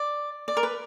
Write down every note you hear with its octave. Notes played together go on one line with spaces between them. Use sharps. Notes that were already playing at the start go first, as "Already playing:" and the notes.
Already playing: D5
D5
A#4
B4